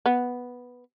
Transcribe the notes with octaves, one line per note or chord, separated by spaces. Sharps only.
B3